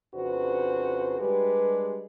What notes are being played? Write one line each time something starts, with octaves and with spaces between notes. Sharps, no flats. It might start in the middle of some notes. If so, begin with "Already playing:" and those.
F2 C#3 D4 F#4 B4 C5
G3 G#3 D4 G4 B4